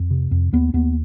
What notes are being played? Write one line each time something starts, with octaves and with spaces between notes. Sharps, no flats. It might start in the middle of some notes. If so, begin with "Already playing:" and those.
Already playing: F2
C3
F2
D#2 B3
D#2 B3